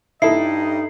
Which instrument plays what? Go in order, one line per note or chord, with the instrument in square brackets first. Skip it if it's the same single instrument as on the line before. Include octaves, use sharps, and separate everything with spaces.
[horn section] G2 D#4 D#5 [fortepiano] E4 A4 [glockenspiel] C7